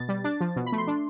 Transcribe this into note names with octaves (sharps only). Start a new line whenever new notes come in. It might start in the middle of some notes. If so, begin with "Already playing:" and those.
Already playing: B2 A6
G3
D4 A6
F3
B2
B5
A3
C6
D4